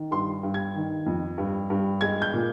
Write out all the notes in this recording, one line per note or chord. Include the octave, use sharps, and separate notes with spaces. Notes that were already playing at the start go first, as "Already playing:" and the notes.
Already playing: D#3
G2 C6
G2
G#6
D#3
F2
G2
G2
G#3 G#6
G6
A#2